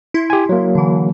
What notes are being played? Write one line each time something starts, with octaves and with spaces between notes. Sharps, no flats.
E4 C6
G4 G#5
F#3 A#3
D3 E3